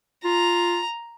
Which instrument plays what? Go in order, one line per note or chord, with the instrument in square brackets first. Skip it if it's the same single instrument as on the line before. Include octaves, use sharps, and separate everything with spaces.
[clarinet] F4 [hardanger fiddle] A#5